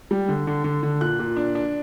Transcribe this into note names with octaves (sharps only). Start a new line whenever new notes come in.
G3
D3
D3
D3
D3
A#2 F#6
A#2
D4
D4